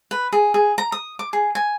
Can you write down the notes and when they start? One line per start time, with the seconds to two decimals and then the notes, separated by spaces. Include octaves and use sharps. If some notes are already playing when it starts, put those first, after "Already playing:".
0.11 B4
0.32 G#4
0.54 G#4
0.78 A#5
0.92 D#6
1.19 D6
1.33 G#4
1.55 G#5